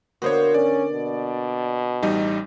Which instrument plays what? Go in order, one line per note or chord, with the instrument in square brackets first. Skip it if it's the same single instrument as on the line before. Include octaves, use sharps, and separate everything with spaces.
[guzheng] D3 A#3 B3 [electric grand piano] F#4 C5 C#5
[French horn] C#4 [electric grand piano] D5
[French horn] B2
[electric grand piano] A1 G3 D#4